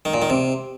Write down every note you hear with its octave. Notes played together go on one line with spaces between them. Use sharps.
D#3
A#2
D#3
C3